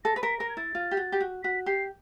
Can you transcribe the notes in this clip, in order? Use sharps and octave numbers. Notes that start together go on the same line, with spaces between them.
A4 A#6
B4
A#4 B6
A#4 A#6
G#6
E4 A6
F4
G4
F#4
G4
F#4
F#4 B6
G4 C7